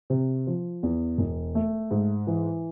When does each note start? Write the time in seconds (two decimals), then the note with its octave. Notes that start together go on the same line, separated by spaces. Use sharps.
0.10 C3
0.47 F3
0.83 E2
1.18 E1
1.55 A3
1.91 G#2
2.27 E3